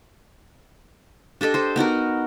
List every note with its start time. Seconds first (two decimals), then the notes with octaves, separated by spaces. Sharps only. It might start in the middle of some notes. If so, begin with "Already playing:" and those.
1.41 D4 G4 A4 D#5
1.54 A4 C5
1.76 B3 D#4 F#4 A#4